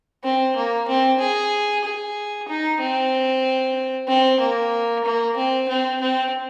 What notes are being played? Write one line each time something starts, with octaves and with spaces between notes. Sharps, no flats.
C4
A#3
C4
G#4
G#4
D#4
C4
C4
A#3
A#3
C4
C4
C4